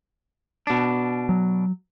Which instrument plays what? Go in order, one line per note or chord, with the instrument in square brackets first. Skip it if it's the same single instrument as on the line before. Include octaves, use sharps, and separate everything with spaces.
[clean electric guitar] B2 D4
[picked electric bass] F#3